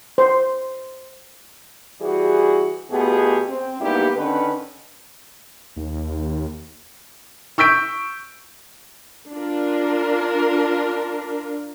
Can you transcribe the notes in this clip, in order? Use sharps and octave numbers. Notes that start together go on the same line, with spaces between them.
C5
E3 G3 F#4 G#4
B2 A3 B3 F4 G4 G#4
C4
G#2 G3 A#3 B3 E4 G4
D3 D#3 C#4 B4
D#2
C#6 E6 G6 B6 D7
D4 F4 A#4